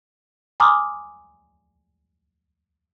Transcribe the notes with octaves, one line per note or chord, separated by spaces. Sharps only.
G#5 A#5 C6 D6 D#6 F6